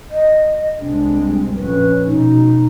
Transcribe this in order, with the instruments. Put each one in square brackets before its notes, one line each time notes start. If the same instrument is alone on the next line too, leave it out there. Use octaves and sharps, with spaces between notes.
[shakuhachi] D#5
[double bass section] C2 G#3 C4 [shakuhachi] D4
[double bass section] A#1 F2 C#4 [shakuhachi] B4
[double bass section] B2 [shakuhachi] D#4